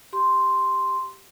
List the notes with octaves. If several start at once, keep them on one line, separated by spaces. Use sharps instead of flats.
G4 C6